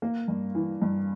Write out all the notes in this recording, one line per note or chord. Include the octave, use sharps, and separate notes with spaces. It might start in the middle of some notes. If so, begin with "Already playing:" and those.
A#3
G2
E3
G2